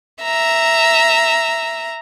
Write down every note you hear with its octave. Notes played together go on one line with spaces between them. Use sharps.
E5 A#5